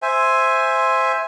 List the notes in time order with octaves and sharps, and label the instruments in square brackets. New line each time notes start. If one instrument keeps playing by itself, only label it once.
[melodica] C5 E5 G#5